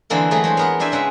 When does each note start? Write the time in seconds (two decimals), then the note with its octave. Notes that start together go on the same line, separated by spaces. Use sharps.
0.10 D3 E3 G#3 A#3 C4 E4
0.31 E3 F#3 A3 G#4
0.44 G#3 C5 G#5
0.57 B3 A#4 F#5
0.79 C4 D4 C5 E5 G#5
0.92 C#3 G#3 B4 E5